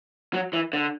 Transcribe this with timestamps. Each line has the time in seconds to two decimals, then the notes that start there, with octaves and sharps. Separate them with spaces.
0.33 F#3
0.53 E3
0.73 D3